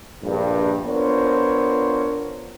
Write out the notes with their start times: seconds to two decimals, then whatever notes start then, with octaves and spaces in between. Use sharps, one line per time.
0.23 A#1 G2
0.86 B3 D4 F4 A#4 C5 C#5